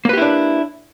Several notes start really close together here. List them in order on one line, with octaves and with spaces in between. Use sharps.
A#3 B4 G4 E4 D4